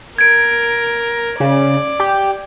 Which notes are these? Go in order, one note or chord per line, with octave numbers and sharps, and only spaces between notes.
A#4 G#6 D7
C#3 D5
G4